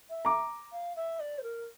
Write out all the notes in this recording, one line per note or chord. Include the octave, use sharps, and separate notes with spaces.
E5
A#5 D6
F5
E5
D5
C5
A#4